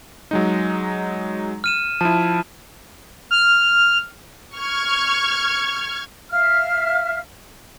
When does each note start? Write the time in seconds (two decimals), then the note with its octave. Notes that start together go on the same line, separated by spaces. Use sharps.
0.31 F#3 G#3 D#4
1.64 F6 D#7 E7
2.01 F3 E4 A5
3.31 F6
4.56 C#6 F6 G#6
6.31 E5 F5 F6